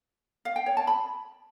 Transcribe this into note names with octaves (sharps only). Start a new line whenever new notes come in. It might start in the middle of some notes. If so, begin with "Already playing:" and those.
F5
G5
C#5
A5
B5